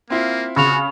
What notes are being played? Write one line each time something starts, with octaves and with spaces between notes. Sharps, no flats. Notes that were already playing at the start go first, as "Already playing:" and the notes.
A#3 C4 E4 F4
C#3 F#4 B5 C#6 F7